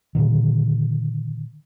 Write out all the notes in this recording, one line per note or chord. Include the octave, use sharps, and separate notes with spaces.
A#2 D3 D#3